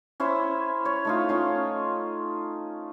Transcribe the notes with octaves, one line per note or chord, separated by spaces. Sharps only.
C#4 E4 C5 E5
C#5
A3 D#4 F4
C#4 F4